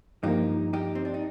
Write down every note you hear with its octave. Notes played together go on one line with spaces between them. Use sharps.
G2 F3 A#3 D#4 G4
D#4 G4
C4
D4
D#4